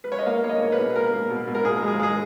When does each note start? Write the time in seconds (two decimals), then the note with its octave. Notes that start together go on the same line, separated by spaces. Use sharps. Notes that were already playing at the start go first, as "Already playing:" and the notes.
0.04 B4
0.12 C#5
0.19 D#5
0.26 A#3 F5
0.43 A#3 C#5
0.49 D#5
0.61 A#3 C#5
0.72 B4
0.78 B2
0.96 A#3 A#4
1.13 A#3
1.30 B2
1.47 B2
1.55 A#4
1.64 A#2 G#4
1.82 G#3
1.88 G#4
1.99 G#3 G#4